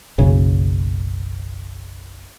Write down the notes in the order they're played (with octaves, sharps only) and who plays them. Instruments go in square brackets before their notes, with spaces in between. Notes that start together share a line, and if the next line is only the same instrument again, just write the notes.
[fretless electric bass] F#1 B1 C#3